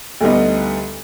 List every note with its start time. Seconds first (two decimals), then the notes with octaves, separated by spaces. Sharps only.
0.21 D2 D3 G3 B3 D#4